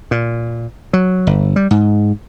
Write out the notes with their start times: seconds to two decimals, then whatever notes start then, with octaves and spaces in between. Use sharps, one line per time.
0.11 A#2
0.93 F#3
1.27 G1
1.56 G3
1.71 G#2